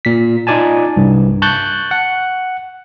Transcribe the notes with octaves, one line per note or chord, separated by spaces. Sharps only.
A#2 B6
D#4 F4 D5 G#5 A5
C2 G2
A5 C#6 F#6 G6 A6
F#5